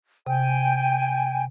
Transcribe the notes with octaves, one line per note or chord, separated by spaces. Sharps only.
C3 G5 G#5